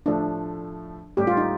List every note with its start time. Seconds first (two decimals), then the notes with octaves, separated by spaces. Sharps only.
0.06 A2 F3 A3 D4
1.17 A1 A2 G3 G4
1.27 F4
1.37 D#4